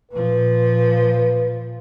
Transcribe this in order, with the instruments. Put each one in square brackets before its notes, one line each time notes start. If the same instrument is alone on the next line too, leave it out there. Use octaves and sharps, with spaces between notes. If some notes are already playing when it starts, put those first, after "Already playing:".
[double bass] A#2 F3 [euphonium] B4